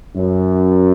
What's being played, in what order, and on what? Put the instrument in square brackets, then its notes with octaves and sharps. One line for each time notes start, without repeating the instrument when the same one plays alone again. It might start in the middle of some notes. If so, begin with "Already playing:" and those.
[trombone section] F#2